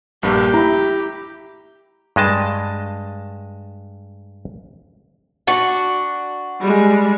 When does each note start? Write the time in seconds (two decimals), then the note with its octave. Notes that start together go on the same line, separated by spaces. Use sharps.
0.23 A#1 G2 A#3 G4
0.54 E4 A#5 B5
2.16 G2 G#3 D#5 A5
5.47 D4 F#4
6.61 G3 G#3